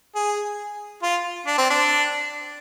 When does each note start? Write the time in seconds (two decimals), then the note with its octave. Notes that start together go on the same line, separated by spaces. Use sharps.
0.15 G#4
1.03 F4
1.46 D4
1.58 C4
1.70 D4